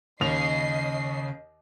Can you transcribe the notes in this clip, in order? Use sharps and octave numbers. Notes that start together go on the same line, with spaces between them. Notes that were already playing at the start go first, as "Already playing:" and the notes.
D#2 C#3 D#5 C7 F7